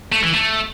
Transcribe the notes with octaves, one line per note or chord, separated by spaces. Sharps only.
A3
E3
A3